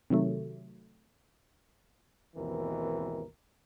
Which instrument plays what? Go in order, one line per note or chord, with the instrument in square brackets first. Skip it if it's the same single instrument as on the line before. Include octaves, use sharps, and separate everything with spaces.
[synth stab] C3 D#3 F#3 A3
[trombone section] G#1 D#2 B2 E3 C4 A#4